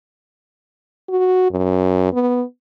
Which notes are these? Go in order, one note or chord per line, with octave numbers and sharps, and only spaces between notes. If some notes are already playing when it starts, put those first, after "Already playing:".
F#4
F#2
B3